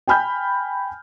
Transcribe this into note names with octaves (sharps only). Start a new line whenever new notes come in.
G5 G#5 B5 F6 G6